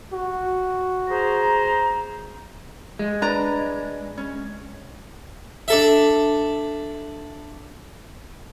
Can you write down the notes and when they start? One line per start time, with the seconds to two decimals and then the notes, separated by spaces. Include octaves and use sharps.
0.13 F#4
1.09 G#4 C5 A#5
2.99 G#3
3.22 D4 B4 A#5
4.18 C#4
5.68 D4 A4 E5